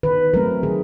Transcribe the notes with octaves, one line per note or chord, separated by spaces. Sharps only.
D#3 B4
F#3 A3 C4 A#4
D#3 G#4